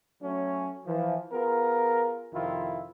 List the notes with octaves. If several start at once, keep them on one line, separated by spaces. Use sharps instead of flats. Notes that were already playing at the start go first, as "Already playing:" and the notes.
F#3 A3 C#4
E3 F3
B3 F4 G#4 A#4
F2 C3 D#3 E4 F4